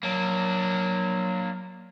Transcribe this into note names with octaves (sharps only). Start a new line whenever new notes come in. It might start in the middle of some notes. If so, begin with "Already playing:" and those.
F#3 A#3 D4